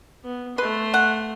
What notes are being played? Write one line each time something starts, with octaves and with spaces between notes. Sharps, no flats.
B3
A3 B4 C6
F#5